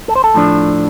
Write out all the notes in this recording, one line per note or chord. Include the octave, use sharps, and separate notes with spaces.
A4
C5
A4
A2 F3 D4